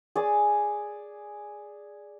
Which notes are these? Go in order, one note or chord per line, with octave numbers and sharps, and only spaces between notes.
G#4 D5